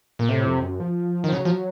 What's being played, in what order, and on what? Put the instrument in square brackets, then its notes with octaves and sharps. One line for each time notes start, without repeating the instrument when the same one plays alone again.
[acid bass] A#2
[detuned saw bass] A2 [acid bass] C3
[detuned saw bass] F2
F#2
F3
[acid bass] D#3
[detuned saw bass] F3
[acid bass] C#3 [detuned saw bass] F#3
[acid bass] F3